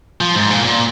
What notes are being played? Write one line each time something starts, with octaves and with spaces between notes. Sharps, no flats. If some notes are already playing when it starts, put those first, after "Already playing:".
F3
G#2
A#2
A#2